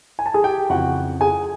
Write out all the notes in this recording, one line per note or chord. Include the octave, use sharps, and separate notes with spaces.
G#5
A5
G#4 G#5
G4 G5
F2 C#3 E3 F#4 F#5
G#4 G#5